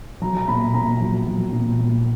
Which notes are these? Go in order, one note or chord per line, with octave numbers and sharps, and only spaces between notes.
F#3 A#5
A#5
A#2 B5
A#2 A#5
F#3
F#3
A#2
A#2